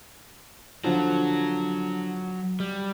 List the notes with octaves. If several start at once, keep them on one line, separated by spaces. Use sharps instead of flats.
D3 F3 F#3
G3